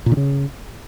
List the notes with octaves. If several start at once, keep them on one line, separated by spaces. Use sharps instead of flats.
A#2
D3
C#3